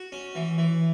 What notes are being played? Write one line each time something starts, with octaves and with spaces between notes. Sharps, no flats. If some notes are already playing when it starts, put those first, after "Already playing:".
Already playing: F#4
C#4
E3
E3